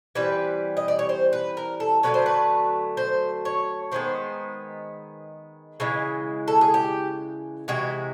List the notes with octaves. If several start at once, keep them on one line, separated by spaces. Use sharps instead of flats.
E3 G3 C4 B4
D#5
D5
C#5
C5
B4
A#4
A4
D3 F#3 A3 C#4 B4
C5
B4
C5
C#5
D#3 G#3 B3 C5
C#3 E3 G#3
A4
G#4
G4
C3 E3 G#3 F#4